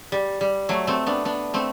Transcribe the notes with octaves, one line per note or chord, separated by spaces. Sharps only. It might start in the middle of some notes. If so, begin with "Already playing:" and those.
G3
G3
F#3 A3
A3 C4
B3 D4
B3 D4
A3 C4